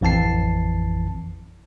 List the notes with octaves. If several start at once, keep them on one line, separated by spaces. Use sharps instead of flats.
A1 F2 E3 A5 C7